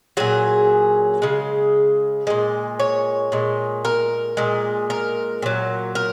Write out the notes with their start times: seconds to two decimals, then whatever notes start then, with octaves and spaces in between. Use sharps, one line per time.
0.17 A#2 F#3 G#4
1.22 C#3 G#3
2.27 A#2 G#3
2.80 C#5
3.32 A#2 G#3
3.85 A#4
4.37 A#2 G#3
4.90 A#4
5.42 A#2 F#3
5.95 A#4